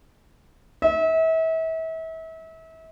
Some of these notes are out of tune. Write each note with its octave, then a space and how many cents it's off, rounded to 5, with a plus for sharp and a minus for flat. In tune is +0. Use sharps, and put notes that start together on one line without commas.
E5 -35